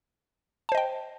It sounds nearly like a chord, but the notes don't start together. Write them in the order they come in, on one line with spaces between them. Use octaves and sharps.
A5 C5 D#5 G5